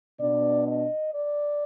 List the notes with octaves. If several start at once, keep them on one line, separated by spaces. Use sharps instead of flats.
B2 B3 D4 D5
D#5
D5